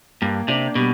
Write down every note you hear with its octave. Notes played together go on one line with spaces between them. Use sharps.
G2 A#3
C3 D4
B2 G3